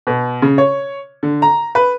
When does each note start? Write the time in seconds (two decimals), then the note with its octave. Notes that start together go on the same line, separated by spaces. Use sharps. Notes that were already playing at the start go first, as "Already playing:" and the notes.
0.07 B2
0.42 C#3
0.58 C#5
1.23 D3
1.42 A#5
1.75 B4